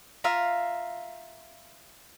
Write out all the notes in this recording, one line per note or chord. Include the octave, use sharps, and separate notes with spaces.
F4 E5 F5 A#5